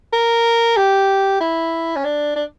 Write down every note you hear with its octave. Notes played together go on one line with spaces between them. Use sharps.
A#4
G4
E4
C#4
D4
D4